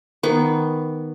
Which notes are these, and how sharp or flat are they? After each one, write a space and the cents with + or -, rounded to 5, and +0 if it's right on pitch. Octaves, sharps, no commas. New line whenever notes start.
D#3 +0 B3 +0 C#6 +45